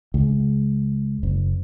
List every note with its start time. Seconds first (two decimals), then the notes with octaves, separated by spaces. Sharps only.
0.14 C#2
1.23 F#1